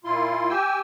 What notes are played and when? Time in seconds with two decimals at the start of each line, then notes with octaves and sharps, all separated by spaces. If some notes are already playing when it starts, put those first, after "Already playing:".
0.04 A#2 E4 F4 C6
0.49 G4 G5 G#5 E6